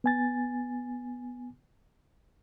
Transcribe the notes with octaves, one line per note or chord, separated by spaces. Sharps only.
B3 G#5 A6